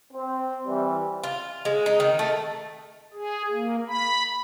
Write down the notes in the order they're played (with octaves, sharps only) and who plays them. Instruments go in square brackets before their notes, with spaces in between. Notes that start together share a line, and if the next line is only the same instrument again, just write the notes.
[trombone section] C4
E3 G3
[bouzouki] F4
G#3
D#4
D#3
A3
[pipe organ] G#4
A#3
B5